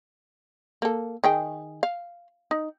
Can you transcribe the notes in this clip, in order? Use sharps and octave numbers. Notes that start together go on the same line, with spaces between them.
A#3 A4
D#3 G#4 G5
F5
D#4